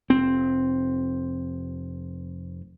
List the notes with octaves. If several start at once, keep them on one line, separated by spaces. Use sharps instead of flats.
F1 C4